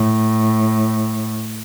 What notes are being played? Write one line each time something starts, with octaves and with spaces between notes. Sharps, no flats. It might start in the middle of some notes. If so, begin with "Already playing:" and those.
Already playing: A2